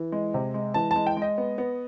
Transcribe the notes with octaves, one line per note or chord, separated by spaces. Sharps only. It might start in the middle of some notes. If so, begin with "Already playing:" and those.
Already playing: E3
G#3
C3
G#3
E3 A5
G#3 A5
G5
G#3 D#5
B3
B3